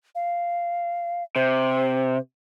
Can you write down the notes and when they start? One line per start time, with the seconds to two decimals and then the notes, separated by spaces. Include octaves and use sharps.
0.15 F5
1.36 C3 C5